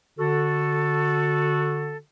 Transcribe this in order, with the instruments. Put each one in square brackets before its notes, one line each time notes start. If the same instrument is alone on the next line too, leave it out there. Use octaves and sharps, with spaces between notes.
[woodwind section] D3 F#4 A4